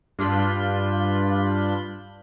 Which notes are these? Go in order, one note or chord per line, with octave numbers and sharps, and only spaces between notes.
G2 D4 F4 B5 G6